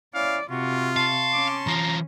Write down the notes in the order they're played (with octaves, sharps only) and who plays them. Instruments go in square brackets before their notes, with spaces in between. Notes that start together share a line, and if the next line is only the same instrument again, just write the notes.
[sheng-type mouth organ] C#4 E4 [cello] D5 [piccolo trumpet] F5
[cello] C3 [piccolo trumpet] F4 [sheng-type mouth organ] F#4
[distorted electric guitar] F5 [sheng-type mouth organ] A5 C6 C#6
[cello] C#4 [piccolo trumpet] D6
[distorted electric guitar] E3 F4 [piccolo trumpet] A#5